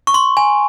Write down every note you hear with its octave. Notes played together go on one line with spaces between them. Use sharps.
C#6
C6
G#5